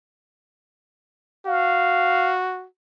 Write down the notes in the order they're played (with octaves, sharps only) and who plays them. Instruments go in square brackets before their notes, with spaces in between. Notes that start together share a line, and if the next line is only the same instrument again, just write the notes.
[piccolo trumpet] F#4 [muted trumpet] F5